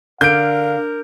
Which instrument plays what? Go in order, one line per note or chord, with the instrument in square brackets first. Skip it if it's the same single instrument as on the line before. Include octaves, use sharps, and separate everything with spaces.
[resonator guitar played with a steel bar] D3 [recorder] A#4 [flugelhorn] F5 [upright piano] G6 D7